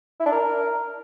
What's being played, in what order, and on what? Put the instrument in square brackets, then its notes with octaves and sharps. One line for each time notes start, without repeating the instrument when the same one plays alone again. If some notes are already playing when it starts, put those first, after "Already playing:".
[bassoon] E4
D4
A#4